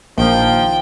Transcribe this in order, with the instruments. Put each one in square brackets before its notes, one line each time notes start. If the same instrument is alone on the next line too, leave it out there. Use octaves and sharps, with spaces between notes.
[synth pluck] A#1 [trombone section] D#3 F3 [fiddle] G5